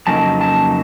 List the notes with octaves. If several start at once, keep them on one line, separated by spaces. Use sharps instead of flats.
F2 C#3 F#3 A#3 D#4 A5
A5